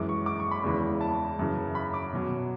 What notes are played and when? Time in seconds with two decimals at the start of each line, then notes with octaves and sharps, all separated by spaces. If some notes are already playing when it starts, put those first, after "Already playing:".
Already playing: F#2 E3 G#3 D6
0.09 C#6
0.26 D6
0.40 C#6
0.51 B5
0.63 E2 C#3 E3 G#3
1.01 A5
1.39 F#2 C#3 E3
1.75 B5
1.94 D6
2.13 B2 F#3